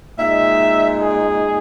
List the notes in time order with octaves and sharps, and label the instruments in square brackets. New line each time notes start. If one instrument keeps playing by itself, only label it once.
[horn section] A#2 G#3 D#4 E5
G#4